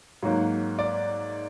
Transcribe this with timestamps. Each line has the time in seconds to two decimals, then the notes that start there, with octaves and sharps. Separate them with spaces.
0.23 G#2 F#3 A#3
0.79 D5